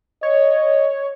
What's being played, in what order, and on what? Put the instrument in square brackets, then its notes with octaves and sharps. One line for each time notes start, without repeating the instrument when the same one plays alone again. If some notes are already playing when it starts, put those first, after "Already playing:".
[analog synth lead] C#5 [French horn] D#5